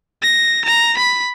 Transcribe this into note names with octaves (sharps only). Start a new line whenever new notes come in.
A#6
A#5
B5